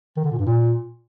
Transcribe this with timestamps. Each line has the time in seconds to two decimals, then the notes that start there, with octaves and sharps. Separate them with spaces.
0.17 D#3
0.24 D3
0.31 A#2
0.39 G2
0.46 A#2